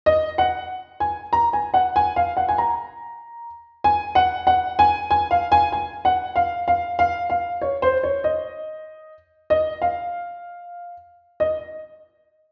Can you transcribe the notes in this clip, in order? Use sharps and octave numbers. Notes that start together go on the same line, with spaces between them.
D#5
F#5
G#5
A#5
G#5
F#5
G#5
F5
F#5
G#5
A#5
G#5
F#5
F#5
G#5
G#5
F5
G#5
G#5
F#5
F5
F5
F5
F5
C#5
C5
C#5
D#5
D#5
F5
D#5